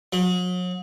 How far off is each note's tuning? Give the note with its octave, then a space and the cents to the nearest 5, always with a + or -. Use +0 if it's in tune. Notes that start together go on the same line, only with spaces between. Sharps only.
F#3 -40